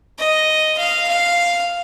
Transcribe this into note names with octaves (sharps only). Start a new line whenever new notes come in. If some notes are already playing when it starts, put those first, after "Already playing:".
D#5
F5
F5